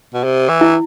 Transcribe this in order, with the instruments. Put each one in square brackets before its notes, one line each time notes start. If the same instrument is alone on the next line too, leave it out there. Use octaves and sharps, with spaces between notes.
[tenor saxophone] B2
C3
E3
[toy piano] E4